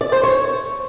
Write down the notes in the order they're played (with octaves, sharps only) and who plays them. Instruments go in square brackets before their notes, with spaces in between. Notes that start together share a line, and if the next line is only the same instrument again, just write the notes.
[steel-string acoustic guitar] D5
C5
C#5